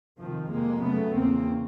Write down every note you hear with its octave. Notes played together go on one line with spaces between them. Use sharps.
F2 C3 D#3 F3
F2 C3 G#3 A#3
F#2 C#3 A3 B3
E2 C#3 A#3 C4